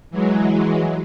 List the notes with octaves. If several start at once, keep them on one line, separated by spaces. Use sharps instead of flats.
E3 F#3 G#3